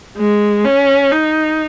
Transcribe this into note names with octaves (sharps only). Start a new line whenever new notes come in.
G#3
C#4
D#4